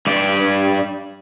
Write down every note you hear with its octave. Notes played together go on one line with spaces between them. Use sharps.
G2 D5